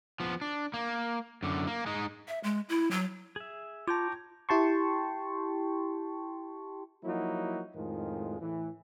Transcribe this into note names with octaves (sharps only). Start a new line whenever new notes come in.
F3 B3
D4
A#3
F#2 D3
A#3
G#3 D#4
E5
G#3
E4
F#3
G#4 E5
F4 C#5 G5 A5 A#5 D6
E4 G4 G5 A5 C6 C#6
F3 F#3 A#3 D#4 E4 F#4
F2 A2 D#3 F3 G#3
A2 E3